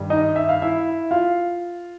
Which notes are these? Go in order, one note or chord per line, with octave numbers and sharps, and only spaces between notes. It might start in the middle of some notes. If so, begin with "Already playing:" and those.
Already playing: G2 D#3 G3
D#4 D#5
E5
F5
E4 E5
F4 F5